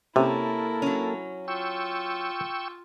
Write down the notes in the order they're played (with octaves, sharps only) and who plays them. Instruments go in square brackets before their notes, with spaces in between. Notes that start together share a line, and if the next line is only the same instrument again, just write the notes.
[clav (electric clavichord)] C3 [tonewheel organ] A#3 A4 [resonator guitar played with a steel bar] C#4 [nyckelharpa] E4 A#4
[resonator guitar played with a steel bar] F#3 C#4
[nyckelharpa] F4 [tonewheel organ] G5 C#6 E6